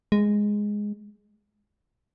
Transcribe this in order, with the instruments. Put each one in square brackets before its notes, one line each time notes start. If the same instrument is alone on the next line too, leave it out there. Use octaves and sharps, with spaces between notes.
[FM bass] G#3